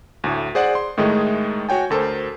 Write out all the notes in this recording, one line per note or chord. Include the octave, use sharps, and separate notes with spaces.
D2 A2
G#4 C5 D5 F#5
C6
A2 D#3 G#3 A3 D#4 G#4
F#4 C#5 G5 G#5
D2 A4 A#4 C5